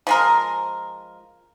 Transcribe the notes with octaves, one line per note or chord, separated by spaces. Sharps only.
F3 G#3 A#4